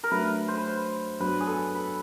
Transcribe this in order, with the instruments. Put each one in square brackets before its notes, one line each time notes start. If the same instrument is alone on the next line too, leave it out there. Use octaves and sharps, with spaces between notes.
[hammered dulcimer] A#4
[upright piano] F#3 A3 D4 [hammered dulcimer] B4
[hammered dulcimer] C5
B4
C5
[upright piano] F#3 B3 D4 [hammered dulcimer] B4
[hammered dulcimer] G#4
A4
B4